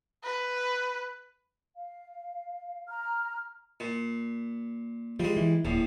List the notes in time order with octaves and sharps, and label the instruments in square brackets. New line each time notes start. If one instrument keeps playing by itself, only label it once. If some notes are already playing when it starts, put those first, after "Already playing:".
[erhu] B4
[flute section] F5
A#5 F6
[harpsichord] A#2
[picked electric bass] F3 [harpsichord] G3 G#3
[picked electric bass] E3
[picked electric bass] D#1 [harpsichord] A#1 A2